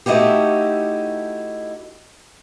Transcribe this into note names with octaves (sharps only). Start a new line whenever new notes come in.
A3 D#4 E4 F#4 G4